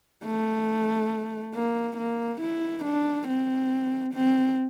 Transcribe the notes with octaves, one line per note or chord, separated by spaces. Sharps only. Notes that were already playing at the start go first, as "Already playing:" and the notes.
A3
A#3
A#3
E4
D4
C4
C4